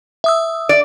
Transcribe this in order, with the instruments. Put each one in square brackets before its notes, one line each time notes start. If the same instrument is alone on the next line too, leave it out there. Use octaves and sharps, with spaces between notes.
[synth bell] E5 D#6 E6
[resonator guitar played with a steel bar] D5